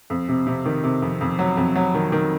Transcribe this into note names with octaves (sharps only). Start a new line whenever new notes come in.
F2
C3
C3
D#3
C3
F2
F2
F#3
F2
F#3
D#3
D#3